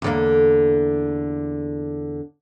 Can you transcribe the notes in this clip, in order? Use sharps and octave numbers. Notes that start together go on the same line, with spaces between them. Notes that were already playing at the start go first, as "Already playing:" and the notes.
E2 D3 A#3